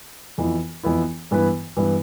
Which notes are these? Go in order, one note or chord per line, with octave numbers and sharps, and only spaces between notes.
F2 E3 B3 E4
F2 E3 B3 E4
G2 E3 B3 E4 B4
G2 E3 B3 E4 B4